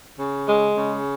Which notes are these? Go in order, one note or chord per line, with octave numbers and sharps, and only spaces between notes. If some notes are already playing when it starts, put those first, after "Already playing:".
C#3
G#3
C#3